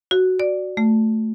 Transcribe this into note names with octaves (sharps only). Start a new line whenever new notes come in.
F#4
D5
A3